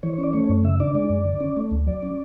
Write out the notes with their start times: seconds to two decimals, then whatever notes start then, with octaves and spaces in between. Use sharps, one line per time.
0.03 E3 C#5
0.13 C#5
0.18 C#4
0.23 D5
0.33 A3 C#5
0.44 C#5
0.49 F#2
0.64 C#3 E5
0.80 D4 D5
0.95 G#3 D5
1.10 F#2
1.25 D3
1.40 C#4
1.57 A3
1.71 D2
1.87 F#3 D5
2.03 C#4